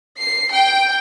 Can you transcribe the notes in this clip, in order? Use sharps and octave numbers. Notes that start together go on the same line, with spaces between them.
C7
G5